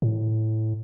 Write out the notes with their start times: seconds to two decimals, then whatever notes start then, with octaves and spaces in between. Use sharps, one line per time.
0.02 A2